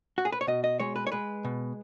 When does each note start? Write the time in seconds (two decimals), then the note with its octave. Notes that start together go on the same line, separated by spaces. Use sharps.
0.18 F#4
0.25 G#4
0.32 B4
0.41 C#5
0.47 B2 D#5
0.64 D#5
0.80 G#3 C#5
0.96 B4
1.07 C#5
1.12 G#3 B4
1.45 B2